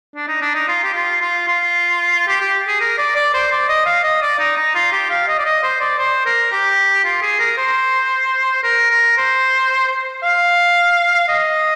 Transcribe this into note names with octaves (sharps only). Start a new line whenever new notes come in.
D4
D#4
D4
D#4
F4
G4
F4
F4
F4
G4
G4
G#4
A#4
D5
D5
C5
D5
D#5
F5
D#5
D5
D#4
D#4
F4
G4
F5
D#5
D5
D#5
C5
D5
C5
A#4
G4
F4
G#4
A#4
C5
A#4
A#4
C5
F5
D#5